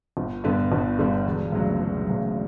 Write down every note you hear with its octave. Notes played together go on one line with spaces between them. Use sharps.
G1
G2 D3 G3 B3
G1
G2 D3 G3 B3
E1
D2 C#3 F#3
E1
D2 C#3 F#3